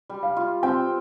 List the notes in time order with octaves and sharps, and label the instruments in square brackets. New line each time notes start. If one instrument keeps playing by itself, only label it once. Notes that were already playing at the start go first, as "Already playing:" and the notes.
[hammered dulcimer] G3
[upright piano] F5
[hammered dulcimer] F4
[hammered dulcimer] C4 [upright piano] G5